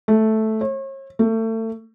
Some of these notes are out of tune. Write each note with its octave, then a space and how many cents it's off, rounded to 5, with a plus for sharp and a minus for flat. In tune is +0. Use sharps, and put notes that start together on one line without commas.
A3 -5
C#5 -40
A3 +30